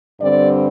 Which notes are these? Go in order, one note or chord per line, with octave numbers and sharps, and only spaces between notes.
G2 D3 G3 C4 D5